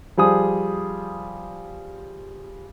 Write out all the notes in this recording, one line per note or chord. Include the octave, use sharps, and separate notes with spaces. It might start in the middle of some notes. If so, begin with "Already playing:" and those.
F3 G3 G#4 D#6